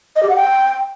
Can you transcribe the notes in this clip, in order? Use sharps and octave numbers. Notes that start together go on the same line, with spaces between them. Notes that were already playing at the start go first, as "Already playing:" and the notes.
D#5
G4
F#5
G5